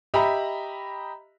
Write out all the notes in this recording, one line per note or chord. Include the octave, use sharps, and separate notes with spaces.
G4 D#5 E5 A#5 B5